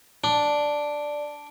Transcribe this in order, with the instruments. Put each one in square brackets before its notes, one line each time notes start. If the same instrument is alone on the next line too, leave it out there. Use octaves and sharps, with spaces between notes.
[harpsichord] D4 [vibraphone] D5